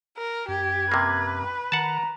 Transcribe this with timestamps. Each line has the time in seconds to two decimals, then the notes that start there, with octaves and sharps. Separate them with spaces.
0.18 A#4
0.48 F#2 G4 G#6
0.92 C3 A#3 B4
1.72 D#3 F#5 A5 A#5